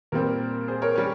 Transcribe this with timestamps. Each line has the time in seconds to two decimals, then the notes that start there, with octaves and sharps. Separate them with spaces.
0.12 A#2 G3 C4 A#4
0.68 G#4 C5
0.82 A#4 C#5
0.96 G3 C#4